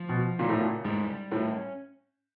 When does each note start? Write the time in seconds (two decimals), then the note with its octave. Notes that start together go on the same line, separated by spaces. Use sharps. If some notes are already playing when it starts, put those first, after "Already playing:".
Already playing: F3
0.09 B2
0.39 A#2 C#3
0.49 A2
0.59 A#2
0.85 G#2 G3
1.31 A2 C#4